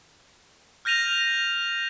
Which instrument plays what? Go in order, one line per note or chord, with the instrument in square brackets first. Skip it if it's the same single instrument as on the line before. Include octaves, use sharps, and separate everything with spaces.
[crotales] F6 G6 A#6 D#7 F7